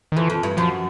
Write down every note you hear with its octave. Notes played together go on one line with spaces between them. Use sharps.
D#3
F2 E3
F2
G2
F#2 F3